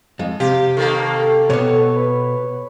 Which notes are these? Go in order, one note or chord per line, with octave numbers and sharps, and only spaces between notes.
F2 G#3
C3 G4 F5
D#3 A#3 A4
B2 B3 C#5
B4